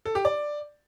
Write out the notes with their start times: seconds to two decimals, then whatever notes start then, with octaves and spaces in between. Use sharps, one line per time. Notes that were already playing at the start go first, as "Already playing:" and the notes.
0.05 A4
0.15 G4
0.25 D5